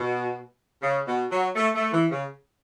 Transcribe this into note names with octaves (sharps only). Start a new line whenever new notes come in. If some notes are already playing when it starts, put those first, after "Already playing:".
Already playing: B2
C#3
B2
F#3
A3
A3
E3
C#3